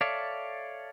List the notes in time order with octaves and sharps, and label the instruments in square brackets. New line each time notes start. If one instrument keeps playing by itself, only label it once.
[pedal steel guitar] A4 C#5 D5 E5 F5